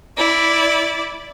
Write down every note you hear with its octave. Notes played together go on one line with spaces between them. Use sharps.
E4 D5